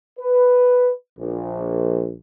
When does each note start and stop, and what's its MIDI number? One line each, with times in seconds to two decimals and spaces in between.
0.19 0.89 71
1.18 2.12 34